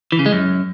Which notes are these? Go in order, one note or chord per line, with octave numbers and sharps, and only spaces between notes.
E3
C#3
G#3
F#2